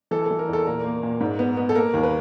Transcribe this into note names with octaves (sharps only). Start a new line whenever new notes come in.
E3 A4
E3 A4
A#4
E2 A4
A#2 A#4
A#3
A#2
G#2
B3
B3
A4
A#3 A#4
D#2
B4